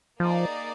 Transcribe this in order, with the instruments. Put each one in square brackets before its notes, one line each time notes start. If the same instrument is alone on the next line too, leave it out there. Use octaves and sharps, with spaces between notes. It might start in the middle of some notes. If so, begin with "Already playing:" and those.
[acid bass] F3 [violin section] A#3 D#4 G#4 D5